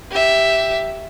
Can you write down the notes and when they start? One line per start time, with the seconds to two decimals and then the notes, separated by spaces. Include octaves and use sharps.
0.11 G4 E5